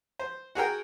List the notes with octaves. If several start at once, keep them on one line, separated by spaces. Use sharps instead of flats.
C5
F#4 G#4 A#4 G5